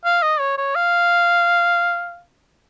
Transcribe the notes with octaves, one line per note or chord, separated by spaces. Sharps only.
F5
D#5
C#5
C#5
F5